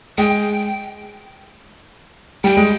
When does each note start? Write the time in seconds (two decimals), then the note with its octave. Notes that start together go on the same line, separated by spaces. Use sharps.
0.18 G#3 G5
2.44 G3 G5
2.57 G#3